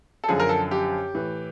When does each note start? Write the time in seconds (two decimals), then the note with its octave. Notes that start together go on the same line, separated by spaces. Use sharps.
0.24 A4
0.29 F#2 D3 F3 G#4
0.40 A#4
0.49 A4
0.71 G4
1.14 A2 E3